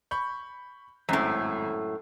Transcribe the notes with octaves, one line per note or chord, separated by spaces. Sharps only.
B5 C#6 G6
G#1 F#2 A2